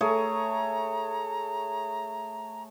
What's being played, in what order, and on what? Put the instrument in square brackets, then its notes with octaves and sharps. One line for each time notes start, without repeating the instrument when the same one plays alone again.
[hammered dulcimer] A3 G#4 C#5 [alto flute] A#5